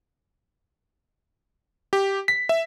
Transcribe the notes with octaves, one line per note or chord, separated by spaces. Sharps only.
G4
B6
E5